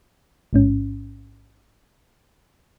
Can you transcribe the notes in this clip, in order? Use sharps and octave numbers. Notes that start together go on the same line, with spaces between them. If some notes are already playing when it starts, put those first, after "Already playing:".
A1 G#2 C#4